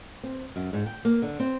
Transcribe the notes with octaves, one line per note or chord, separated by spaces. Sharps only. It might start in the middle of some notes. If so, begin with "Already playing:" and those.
C4
F#2
G#2
G5
A#3
D3
C4